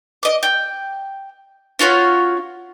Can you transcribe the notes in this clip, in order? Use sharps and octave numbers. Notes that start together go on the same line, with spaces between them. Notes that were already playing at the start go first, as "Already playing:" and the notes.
D#5 D6
G5
C#4 F4 F#4 C#5